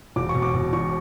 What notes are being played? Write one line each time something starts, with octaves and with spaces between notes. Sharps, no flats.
E1 D6
C#6
B2
D6
B2
E1 C#6